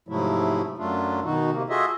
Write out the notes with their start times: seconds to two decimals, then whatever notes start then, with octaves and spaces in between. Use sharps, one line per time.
0.08 G#2 C3 F3 F#3 A3 E4
0.78 F#2 F#3 A3 D4 F4
1.23 B2 D#3 D#4 F#4
1.52 C3 A#3
1.69 F4 F#4 G#4 A4 D#5 E5